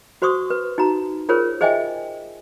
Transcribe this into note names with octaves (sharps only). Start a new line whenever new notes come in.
F#4 C5 C6 C#6 D#6
B4
D#4 F#4 A#5
F4 G#4 A#4 C5 C#5
G#4 C5 D#5 E5 G5 G#5